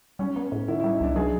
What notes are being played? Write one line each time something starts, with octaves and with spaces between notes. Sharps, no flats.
G3 C#4
B3
A2
D#3 E4
E4
G3
D#4
C2 D4
F#3 G#4